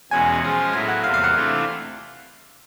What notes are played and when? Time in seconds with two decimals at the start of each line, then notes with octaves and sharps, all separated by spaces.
0.11 E2 B2 G#3 C#4 F#4 G#5
0.42 F3 G#3 C#4 F4 G#4
0.73 A2 F#3 B3 E4 G#5
0.88 F#5
1.04 E2 C3 E3 G3 A#3 F5
1.14 F5
1.24 F#5
1.34 C3 E3 A3 D4 F4